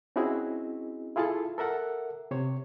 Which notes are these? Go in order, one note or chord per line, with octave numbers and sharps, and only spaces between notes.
C4 C#4 E4 F#4 G#4 D#5
E4 F4 G#4 A4 A5
A4 A#4 E5 F#5
C3 C5 C#5